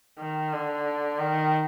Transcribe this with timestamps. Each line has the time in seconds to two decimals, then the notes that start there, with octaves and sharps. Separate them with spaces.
0.19 D#3
0.53 D3
1.20 D#3